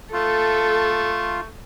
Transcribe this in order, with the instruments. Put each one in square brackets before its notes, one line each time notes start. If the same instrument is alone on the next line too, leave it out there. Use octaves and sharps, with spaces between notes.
[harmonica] A3 [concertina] F4 [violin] A4